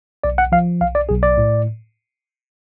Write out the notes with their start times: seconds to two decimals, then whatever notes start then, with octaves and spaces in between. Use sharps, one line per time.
0.24 B1 D5
0.38 F#5
0.52 F3 F5
0.81 B1 F5
0.95 D5
1.09 B1 G#4
1.23 D5
1.37 A2